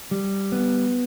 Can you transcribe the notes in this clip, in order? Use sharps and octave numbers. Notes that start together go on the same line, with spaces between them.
G3
B3